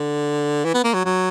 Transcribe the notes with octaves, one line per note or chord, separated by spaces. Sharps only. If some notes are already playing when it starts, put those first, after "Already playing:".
Already playing: D3
E3
B3
A#3
F#3
F#3